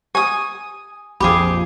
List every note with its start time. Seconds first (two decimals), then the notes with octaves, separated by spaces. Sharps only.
0.15 G4 G#5 D#6
1.20 A#1 F2 F3 G4 G#4 B5 D6